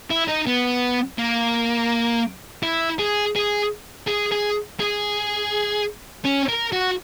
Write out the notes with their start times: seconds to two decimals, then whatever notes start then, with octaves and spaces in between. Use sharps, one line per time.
0.10 E4
0.28 D#4
0.47 B3
1.19 A#3
2.63 E4
2.99 G#4
3.36 G#4
4.08 G#4
4.32 G#4
4.80 G#4
6.25 C#4
6.48 A#4
6.72 F#4